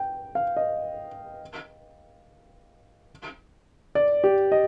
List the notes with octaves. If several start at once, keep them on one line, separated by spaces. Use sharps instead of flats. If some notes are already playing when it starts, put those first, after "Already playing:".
Already playing: G5
F5
D#5
D5
G4
D#5